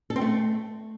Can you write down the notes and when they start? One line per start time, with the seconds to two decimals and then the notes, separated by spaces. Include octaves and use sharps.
0.10 A4
0.16 C4
0.21 A3